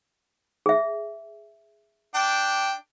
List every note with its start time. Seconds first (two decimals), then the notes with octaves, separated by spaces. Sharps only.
0.66 G#4 E5
2.14 D4 G5